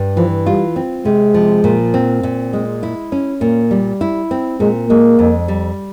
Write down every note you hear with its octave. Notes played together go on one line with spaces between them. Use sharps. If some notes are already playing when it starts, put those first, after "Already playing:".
Already playing: G2
E3 F3
G3 F4
C4
C3 G#3
F3
A#2
C4
A#2
G#3
E4
C#4
A#2 A#3
G3
E4
C4
A#2 G#3
G#3 A#3
F2
G3